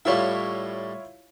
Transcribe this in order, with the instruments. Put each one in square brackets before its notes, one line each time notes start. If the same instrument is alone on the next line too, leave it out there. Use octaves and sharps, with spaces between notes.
[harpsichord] A2 G3 E5 [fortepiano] E4 F4 C#5